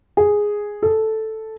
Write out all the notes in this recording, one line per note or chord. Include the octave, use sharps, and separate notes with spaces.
G#4
A4